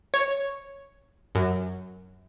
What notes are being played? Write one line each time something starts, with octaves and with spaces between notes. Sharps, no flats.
C#5
F#2